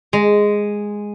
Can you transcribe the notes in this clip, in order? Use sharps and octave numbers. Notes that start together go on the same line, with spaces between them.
G#3